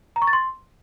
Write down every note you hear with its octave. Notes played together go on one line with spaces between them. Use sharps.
A#5
C#6
A6
C6